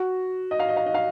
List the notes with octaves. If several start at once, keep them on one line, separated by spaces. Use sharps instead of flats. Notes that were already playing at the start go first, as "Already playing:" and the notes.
Already playing: F#4
D#5
F5
D#5
F5
D#5
F5